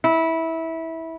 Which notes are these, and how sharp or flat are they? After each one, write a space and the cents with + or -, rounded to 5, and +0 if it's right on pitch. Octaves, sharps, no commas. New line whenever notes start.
E4 -20